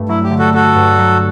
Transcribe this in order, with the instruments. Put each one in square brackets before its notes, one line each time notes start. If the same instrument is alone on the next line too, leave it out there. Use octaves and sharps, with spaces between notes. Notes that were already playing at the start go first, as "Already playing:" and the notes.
Already playing: [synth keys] G2 A3
[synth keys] F#3 [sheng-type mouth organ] E4
[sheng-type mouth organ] G4
[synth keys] D3
[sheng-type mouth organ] F#4 A4
[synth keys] A3 [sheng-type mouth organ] F#4 A4
[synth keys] G2
F#3